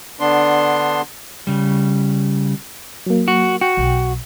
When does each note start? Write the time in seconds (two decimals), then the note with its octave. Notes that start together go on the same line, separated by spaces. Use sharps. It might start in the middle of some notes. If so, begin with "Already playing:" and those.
0.20 D3 B3 D4 C6
1.47 C#3 G3
3.06 F#3 A#3
3.28 F#4
3.61 F#4 G5
3.77 B1